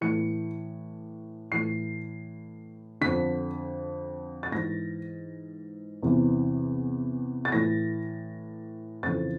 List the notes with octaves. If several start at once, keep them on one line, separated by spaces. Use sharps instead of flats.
A2 E3 C#7
A2 E3 C7
F2 D3 B6
A6
G#2 E3 A#6
E2 C3 E3
A6
A2 E3 A#6
F2 C#3 E3 A6